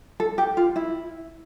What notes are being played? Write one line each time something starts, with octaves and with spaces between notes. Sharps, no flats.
A4
G4
F4
E4